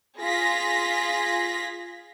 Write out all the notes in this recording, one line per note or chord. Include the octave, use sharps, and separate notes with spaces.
F4 G#4 A#6 B6